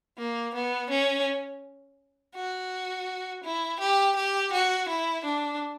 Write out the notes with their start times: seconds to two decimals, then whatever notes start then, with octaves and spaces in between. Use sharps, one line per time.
0.18 A#3
0.54 B3
0.90 C#4
2.35 F#4
3.44 E4
3.80 G4
4.16 G4
4.53 F#4
4.89 E4
5.25 D4